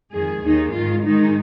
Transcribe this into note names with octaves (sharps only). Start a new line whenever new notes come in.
F2 D#3 G#3 G#4
D#2 D#3 A#3 D#4
G#2 D#3 G#3 F4
G#2 D#3 G#3 D#4